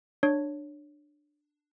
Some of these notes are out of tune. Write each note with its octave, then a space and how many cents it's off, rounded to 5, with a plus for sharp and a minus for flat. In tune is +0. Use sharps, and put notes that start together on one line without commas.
D4 +15 C#5 +0